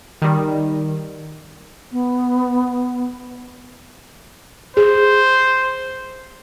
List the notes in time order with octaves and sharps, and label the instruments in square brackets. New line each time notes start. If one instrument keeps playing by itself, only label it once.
[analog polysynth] D#3 G3
[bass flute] B3
[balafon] G#4 [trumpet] C5